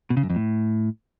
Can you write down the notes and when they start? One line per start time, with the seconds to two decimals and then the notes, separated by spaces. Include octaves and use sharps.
0.10 B2
0.17 C#3
0.23 F#2
0.30 F2
0.36 A2